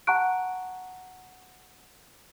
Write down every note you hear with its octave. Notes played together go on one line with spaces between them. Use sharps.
F#5 A5 A#5 C#6 F#6 D7